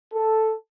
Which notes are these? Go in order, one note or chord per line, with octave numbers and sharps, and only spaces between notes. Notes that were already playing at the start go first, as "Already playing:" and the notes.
A4